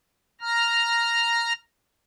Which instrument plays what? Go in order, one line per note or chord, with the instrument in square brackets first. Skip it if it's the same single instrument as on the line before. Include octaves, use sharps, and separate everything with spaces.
[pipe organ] A#5 F6